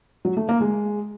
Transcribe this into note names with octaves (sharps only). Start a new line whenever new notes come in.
F#3
A3
A#3
G#3